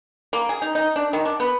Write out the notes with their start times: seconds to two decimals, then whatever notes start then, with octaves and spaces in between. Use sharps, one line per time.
0.33 A#3
0.49 G#4
0.62 D#4
0.75 D#4
0.96 D4
1.13 D#3
1.25 D4
1.40 B3